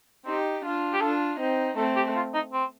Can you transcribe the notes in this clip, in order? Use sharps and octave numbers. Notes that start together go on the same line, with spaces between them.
C4 D#4 G4
D4 F4
G4
D4 F4 A4
C4 D#4
A3 C4 A4
G4
F4
D#4
C4